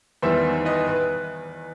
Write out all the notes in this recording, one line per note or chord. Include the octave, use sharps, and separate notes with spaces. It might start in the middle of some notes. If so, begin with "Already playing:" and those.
E2 D#3 G3 B3 C5 E5
B4 D#5
B4